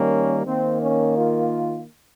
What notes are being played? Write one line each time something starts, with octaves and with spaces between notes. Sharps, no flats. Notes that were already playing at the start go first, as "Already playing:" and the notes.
Already playing: D#3 G3 A#3 C#4
D#3 A#3 C4
C#4
F4